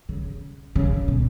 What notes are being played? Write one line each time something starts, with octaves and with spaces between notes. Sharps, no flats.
C#3
C#3
B2